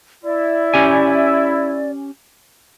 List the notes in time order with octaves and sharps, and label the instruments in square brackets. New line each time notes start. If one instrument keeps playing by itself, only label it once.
[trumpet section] E4 [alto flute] D5
[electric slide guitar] C#4 G4 G#5